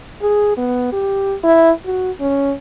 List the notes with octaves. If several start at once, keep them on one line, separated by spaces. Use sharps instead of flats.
G#4
B3
G4
E4
F#4
C#4